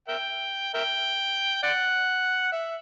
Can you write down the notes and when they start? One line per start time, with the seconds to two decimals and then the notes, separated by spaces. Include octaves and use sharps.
0.08 A#4 E5 G5
0.74 A#4 E5 G5
1.63 D5 F#5
2.52 E5